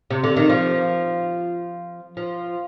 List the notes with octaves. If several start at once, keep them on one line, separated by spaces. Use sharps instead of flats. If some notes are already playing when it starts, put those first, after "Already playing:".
C3
D3
D#3
F3
F3